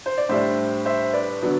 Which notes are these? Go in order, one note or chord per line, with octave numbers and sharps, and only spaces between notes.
C5
D5
A2 G3 D4 C5 E5
C5 E5
B4 D5
D3 F#3 B3 D4